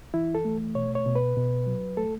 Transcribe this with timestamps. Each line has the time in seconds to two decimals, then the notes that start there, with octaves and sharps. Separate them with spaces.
0.14 E3 E4
0.35 A4
0.45 A3
0.75 B2 C#5
0.95 C#5
1.06 B2
1.16 B4
1.36 B2
1.67 F#3
1.97 A3 A4